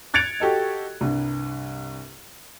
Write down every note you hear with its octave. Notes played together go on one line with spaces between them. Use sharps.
F#6 G#6 A6 C#7 D7 F7
F#4 G4 A4 D#5
C2 G2